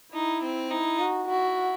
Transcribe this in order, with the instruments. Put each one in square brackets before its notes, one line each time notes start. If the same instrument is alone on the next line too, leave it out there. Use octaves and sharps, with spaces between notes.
[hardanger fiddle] D#4 [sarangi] E4
[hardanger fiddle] C4
[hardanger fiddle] D#4 [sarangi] E4
[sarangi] F#4
[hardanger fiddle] E4 [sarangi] F#4